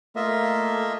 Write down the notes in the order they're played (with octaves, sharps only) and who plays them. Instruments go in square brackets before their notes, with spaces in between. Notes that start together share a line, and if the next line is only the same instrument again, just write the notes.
[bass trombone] A3 [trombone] A#3 [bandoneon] F4 D#5 E5